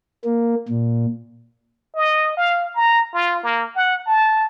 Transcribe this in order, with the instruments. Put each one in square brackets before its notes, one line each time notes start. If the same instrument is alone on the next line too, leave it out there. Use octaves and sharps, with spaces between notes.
[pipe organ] A#3
A#2
[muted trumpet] D#5
F5
A#5
F4
A#3
F#5
A5